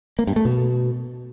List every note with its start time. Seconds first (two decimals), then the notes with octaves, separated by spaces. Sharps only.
0.19 A#3
0.27 G2
0.36 A3
0.45 B2